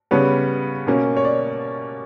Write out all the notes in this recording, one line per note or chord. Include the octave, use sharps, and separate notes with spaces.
C#3 G3 B3 C#5
B2 A#3 C#4
C#5
D5